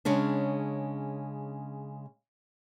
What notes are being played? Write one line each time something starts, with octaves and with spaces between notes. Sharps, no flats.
C#3 G#3 C#4 D4